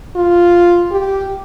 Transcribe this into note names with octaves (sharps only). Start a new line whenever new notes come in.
F4
G4